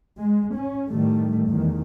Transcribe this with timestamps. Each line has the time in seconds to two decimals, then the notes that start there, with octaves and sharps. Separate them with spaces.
0.18 G#3
0.54 C#4
0.89 A2 D#3 G3 A3
1.46 E2 D#3